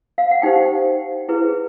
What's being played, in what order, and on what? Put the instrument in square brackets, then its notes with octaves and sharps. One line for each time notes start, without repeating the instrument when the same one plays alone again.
[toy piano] F5
F#5
D#4 G4 C5 G5
E4 G#4 B4